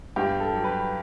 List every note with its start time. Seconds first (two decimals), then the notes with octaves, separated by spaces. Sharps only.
0.16 G2 G4
0.40 A4
0.53 F#3
0.64 B4